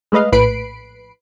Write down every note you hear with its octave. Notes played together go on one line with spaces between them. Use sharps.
G#3 A3 B4 D#5 F5
A#1 A2 B4 B5 C7 D7